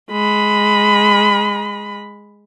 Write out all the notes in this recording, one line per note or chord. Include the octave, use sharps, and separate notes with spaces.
G#3 B5